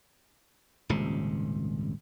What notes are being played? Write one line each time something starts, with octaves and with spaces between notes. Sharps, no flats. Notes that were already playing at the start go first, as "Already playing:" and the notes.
D#1 G#1 C#2 C3